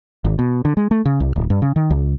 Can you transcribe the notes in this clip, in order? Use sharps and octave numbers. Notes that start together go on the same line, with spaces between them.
G#1
B2
D3
G#3
A3
C#3
C2
D1
G2
C#3
D#3
C#2